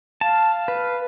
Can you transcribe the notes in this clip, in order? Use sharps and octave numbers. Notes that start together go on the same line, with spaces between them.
F5 A5
B4